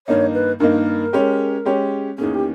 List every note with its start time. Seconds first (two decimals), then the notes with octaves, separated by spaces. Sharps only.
0.07 G2 D#3 A#3 D#4 C#5
0.33 B4
0.60 G2 D#3 A#3 D#4 A#4
1.13 G#3 C#4 G4 C#5
1.65 G#3 C#4 G4 C#5
2.18 E2 D#3 A#3 C#4 G#4
2.34 G4